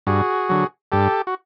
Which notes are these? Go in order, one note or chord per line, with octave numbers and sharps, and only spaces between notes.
G2 F#4 G#4
D3 F#3
G2 G4 A4
F#4